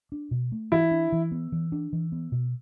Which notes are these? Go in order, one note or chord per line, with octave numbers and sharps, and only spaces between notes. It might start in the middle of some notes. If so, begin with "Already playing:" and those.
D4
B2
A3
E3 E4
D4
E3
B3
E3
D4
E3
B3
B2